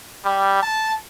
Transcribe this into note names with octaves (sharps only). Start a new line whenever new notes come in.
G3
A5